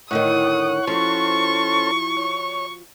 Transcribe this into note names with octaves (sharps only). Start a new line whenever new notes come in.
A2 D3 D#3 C#5 F#5 C#6 D#6
F3 C#4 E4 F#4 A4 C5 C#6
C#5